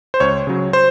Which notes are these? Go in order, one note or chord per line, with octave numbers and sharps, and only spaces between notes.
C5
C#2 C#5
C#3 F#3
C5